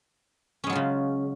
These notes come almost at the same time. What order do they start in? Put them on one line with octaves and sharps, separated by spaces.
C#4 G#3 F#3 F4 C#3